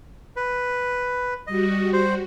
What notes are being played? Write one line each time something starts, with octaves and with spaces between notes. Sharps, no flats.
B4
G3 F#4 D#5
C5